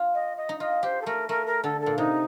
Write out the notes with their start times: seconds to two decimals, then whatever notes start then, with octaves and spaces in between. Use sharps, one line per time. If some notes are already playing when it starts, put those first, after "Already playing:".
Already playing: F4
0.14 D#5
0.37 D#5
0.49 D#4
0.60 F4 D#5
0.83 G4 C5
1.01 A4
1.06 A3 A#4
1.29 A3 A#4
1.46 A#4
1.63 D3 A4
1.81 A4
1.86 A#2
1.97 C3 D#4